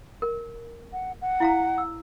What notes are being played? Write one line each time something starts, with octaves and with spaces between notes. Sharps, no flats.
A#4
F#5
F#5
E4 F5 A#5
E6